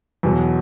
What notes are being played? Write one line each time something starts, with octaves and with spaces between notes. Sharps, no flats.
E2 B2 F#3